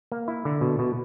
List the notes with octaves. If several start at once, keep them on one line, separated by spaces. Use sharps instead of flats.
A#3
E4
D3
B2
B2